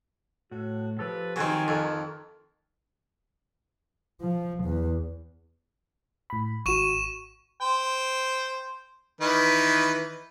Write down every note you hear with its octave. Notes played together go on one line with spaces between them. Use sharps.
A2 F#4
F3 G4 A4 B4
D#3 F#3 C4 G#5
F2
F3
E2
A2 B5
G#1 F#4 C#6 D#7 E7
C5 G5
D#3 E3 B4